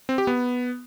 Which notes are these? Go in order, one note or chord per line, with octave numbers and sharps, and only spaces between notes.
C4
G4
B3